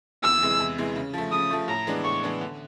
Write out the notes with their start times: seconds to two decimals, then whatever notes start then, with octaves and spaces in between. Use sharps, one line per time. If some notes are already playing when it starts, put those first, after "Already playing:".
0.23 E2 E6
0.42 C3 E3 G#3
0.60 E2
0.78 C3 E3 G#3
0.96 C#3
1.14 F3 A3
1.32 C#3 D#6
1.51 F3 A3
1.68 A2 A#5
1.87 E3 G#3 B3 D4
2.04 A2 C#6
2.23 E3 G#3 B3 D4
2.41 D3